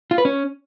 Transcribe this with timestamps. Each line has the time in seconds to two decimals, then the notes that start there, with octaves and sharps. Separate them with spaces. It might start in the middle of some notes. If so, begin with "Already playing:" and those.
0.11 F4
0.18 B4
0.25 C#4